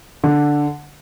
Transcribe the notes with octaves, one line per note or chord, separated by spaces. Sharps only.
D3